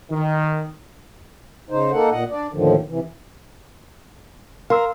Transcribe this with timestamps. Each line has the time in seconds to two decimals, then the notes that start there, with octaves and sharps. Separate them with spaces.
0.11 D#3
1.70 C#3 D#4 C5
1.92 A#3 D#4 A4 F#5
2.11 A#2 D#5 F#5
2.31 D4 D5
2.53 D#2 A2 D3 D#3 F3
2.89 C3 E3
4.70 A#4 F5 C6 E6